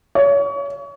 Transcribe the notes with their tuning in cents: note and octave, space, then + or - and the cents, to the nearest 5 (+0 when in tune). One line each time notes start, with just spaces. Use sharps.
C#5 +30